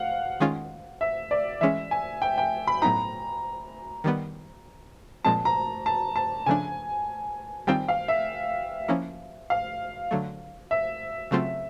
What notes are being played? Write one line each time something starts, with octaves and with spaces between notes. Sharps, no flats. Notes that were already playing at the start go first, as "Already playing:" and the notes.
Already playing: F5 F#5
D#3 G#3 C#4 F4
E5
D5
E3 G#3 C#4 E5
G#5
G5
G5
B5
A2 F#3 B3 D#4 A#5
D#3 G3 B3
A#2 F3 G#3 C4 A5
A#5
A5
A5
C#3 F3 A3 D4 G#5
D#3 G3 C4 F4 G5
F5
E5
F3 A#3 C#4 E4
F5
D3 F#3 A3
E5
C#3 F#3 A3 C4 F4